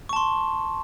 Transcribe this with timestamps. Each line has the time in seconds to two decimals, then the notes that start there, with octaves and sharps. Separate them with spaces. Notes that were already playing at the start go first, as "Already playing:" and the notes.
0.09 C#6
0.13 A5
0.16 C6